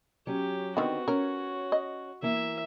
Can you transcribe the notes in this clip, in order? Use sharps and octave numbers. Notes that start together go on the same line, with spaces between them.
F#3 C#4 G4
D3 D#3 B3 C4 F#4
C#4 A#4 C#5
D#5
E3 A#3 E4 E5